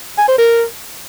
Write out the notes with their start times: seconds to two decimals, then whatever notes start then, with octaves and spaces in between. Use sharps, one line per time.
0.18 G#5
0.28 C5
0.38 A#4